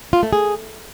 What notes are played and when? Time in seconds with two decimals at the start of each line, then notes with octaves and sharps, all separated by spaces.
0.13 F4
0.23 A3
0.33 G#4